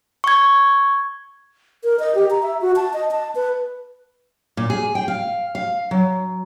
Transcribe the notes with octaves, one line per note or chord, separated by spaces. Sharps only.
C#6 G#6
A#4
D#5
G4
A#5
E5
F#4
A5
D#5
A5
B4
A#2
G#4
G5
F5
F5
F#3